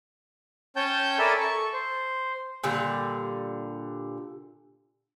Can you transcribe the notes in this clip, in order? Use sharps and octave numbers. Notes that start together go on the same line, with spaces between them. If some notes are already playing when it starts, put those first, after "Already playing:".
C#4 C#5 G5 A5 G6
A4 A#4 D5 E5 G#5 B5
A4 C#6
C5
A#2 D3 G3